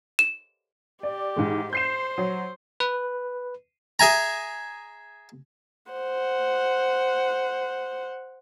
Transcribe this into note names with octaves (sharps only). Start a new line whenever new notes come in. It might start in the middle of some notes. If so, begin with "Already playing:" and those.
E7
G4 D5
G#2 E3 G#3
C5 G6 C7 E7
F#3
B4
G#4 E5 G#5 A#5
C5 F#5